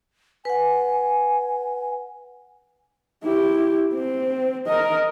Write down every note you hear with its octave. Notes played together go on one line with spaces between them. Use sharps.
B4 F#5 G#5
E4 G4
C4
A#4 D#5